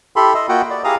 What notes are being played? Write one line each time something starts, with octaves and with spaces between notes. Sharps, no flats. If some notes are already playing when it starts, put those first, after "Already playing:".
E4 G4 A4 B5 C6
D#5 E5
A#3 F4 F#4 D#5 F#5 G5
D5
E4 G4 G#4 F5 A#5 D#6